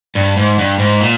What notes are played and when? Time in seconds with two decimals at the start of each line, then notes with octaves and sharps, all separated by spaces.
0.15 G2
0.37 G#2
0.59 G2
0.79 G#2
1.01 A#2